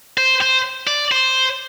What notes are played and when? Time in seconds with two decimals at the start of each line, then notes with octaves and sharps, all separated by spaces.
0.18 C5
0.41 C5
0.87 D5
1.12 C5